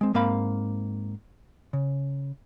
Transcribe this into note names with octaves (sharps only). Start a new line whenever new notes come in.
G#3 C4
G#2 A#3 C4 F5 B5
C#3